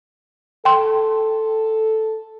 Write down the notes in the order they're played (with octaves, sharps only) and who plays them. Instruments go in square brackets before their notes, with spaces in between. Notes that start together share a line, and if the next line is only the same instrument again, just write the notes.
[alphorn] A4 [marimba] G5 C6